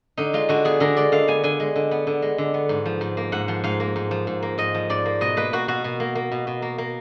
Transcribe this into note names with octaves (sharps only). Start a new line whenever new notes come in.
D3 D#4
G#3 F4
D3 F#4
B3 G#4
D3 A#4
G#3 D5
D3 F5
B3 G#5
D3 G#5
G#3
D3
B3
D3
G#3
D3
B3
G#2
F3
G#2
A#3
G#2 F#5
F3
G#2 F5
A#3
G#2
F3
G#2
A#3
G#2 D#5
F3
G#2 D5
A#3
B2 D#5
A#3 B4
A#3 F#4
B2 F#4
B2
A#3
A#3
B2
B2
A#3
A#3